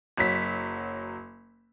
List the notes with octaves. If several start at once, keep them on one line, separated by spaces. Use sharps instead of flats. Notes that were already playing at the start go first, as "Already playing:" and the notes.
F#1 F#3 B6